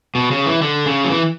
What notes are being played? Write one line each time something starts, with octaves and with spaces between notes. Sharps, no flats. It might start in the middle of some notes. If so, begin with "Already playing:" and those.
B2
C#3
E3
D3
C#3
F#3
E3